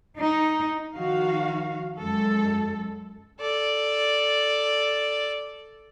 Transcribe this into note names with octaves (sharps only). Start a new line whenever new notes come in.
D#4
D#3 F3 F#4 F5
F#2 G#3 A4
A4 D5